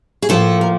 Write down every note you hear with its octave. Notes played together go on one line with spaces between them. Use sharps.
G#4
A2 F3 A#3 A4
A#4